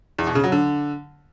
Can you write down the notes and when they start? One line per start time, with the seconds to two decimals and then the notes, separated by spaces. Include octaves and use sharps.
0.19 E2
0.27 B2
0.35 C#3
0.44 F#3
0.52 D3